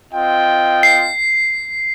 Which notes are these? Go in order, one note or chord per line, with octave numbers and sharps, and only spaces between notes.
C4 F4 D#5 G5
C7